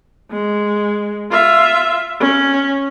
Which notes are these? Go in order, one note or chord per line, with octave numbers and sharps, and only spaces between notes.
G#3
F4 E5
C#4